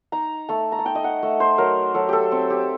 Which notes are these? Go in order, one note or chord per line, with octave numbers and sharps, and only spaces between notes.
D#4 A#5
A3 A5
A#5
A5
D#4 G5
D#5
F#5
A3
C5
F#3 A#4
F#3 A4
G4 A4
C4
G4